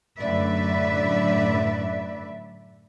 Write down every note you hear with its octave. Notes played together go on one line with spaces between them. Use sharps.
F#2 A2 D3 B4 D5 E5